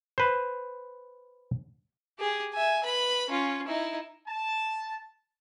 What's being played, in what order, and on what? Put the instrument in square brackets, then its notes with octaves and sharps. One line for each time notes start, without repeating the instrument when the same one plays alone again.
[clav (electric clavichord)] B4 C5
[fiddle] G4 G#4
E5 G#5
B4 B5
C#4 F4
D#4 E4
[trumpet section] A5